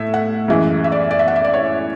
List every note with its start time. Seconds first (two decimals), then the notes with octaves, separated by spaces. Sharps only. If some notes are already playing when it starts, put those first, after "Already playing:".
Already playing: A2 E5
0.14 F#5
0.48 F#2 E3 G#3
0.84 E5
0.92 D5
1.11 D5
1.19 E5
1.28 F#5
1.36 E5
1.44 D5
1.54 C#5